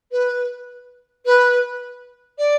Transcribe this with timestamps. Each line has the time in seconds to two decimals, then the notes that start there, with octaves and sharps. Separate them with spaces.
0.11 B4
1.25 B4
2.38 D5